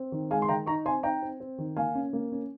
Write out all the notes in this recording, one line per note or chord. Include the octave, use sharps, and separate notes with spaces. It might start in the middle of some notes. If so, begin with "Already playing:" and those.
Already playing: C4
D#3
G#3 F5 G#5
C6
D#3 G5 A#5
D#4 A#5 C#6
C4 G#5 C6
D#4 G5 A#5
C4
C4
D#3
A#3 F5 G#5
C#4
A#3
C#4